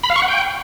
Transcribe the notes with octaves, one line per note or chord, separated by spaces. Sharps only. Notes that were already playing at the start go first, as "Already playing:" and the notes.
B5
F5
C#6
F#5
G5